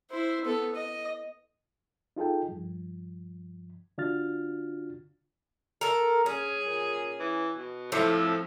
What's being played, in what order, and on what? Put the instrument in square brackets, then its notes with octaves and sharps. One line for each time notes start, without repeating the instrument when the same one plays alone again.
[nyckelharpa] E4 C5
B3 A4
D#5
[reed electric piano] D#4 F4 G#4 A4 G5
G2 F3
D3 D4 F4 F#4 F6 A6
[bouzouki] A4 A#4
[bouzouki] C#4 [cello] G#4
[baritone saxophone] A#2
E3
B2
[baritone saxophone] A2 [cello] F3 [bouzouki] A3 C4